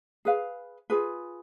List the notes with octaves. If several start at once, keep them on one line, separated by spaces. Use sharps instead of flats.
G#4 B4 F5
F4 G#4 B4